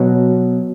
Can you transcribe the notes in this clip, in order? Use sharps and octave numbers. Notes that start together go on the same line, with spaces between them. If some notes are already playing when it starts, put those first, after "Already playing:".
Already playing: B2 F#3